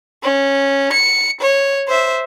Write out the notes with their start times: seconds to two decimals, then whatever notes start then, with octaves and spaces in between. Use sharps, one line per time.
0.23 C#4
0.93 C#7
1.40 C#5
1.88 C5 E5